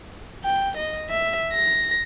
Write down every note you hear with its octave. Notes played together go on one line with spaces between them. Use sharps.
G5
D#5
E5
A#6